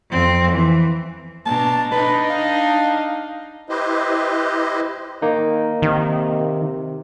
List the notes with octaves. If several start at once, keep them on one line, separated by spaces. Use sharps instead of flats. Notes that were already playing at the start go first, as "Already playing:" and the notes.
F2 C4
E3
B2 D4 A5 A#5
D4 D#4 B4 D#5
F5
E4 G4 B4 C5 D#5
D#3 A#3 D#4
C3 D#3